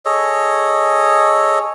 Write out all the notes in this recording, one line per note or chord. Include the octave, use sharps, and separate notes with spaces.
G#4 A4 C#5 D#5